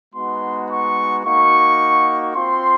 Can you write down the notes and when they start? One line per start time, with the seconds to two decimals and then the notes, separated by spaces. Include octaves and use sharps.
0.14 G#3 B3 D#4 F#4 C6
0.69 C#6
1.24 A#3 D#4 F#4 C#6
2.35 C4 F4 C6